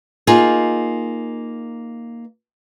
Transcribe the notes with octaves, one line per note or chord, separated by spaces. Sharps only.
A#3 D#4 F4 G#4